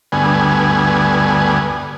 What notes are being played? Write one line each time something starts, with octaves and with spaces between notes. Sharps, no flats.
D2 G2 B3 G#5